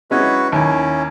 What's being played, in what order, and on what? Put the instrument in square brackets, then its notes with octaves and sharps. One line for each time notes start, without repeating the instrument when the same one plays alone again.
[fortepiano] G#3 C#4 D#4 [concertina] E4 F#4 B4
[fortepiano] D#2 [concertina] C#4 E4